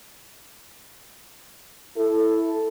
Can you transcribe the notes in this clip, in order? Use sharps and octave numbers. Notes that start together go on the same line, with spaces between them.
E4 A4